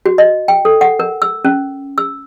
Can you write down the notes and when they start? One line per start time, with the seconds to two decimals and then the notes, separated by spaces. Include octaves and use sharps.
0.06 F#4
0.18 D#5
0.48 G5
0.65 A4
0.81 F#5
1.00 A#4
1.22 E6
1.45 C#4
1.98 E6